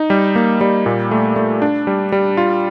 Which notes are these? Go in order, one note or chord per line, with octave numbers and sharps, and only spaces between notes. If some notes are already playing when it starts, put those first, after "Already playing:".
Already playing: D#4
G3
A#3
G3
A#2
A3
A3
D4
G3
G3
F4